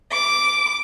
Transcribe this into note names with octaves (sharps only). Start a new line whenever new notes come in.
D6